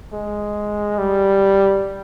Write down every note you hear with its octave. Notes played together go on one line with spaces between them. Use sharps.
G#3
G3